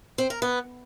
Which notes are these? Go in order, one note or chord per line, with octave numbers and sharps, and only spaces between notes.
C4
A#4
B3